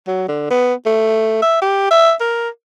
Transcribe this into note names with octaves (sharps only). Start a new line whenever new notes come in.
F#3
D3
B3
A3
E5
G4
E5
A#4